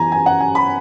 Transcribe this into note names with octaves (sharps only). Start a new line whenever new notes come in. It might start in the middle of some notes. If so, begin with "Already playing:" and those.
Already playing: F#2 E3 B3 G#5 A#5
G#5
F#5
G#5
B5